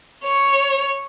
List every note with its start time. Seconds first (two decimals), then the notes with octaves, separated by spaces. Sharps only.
0.24 C#5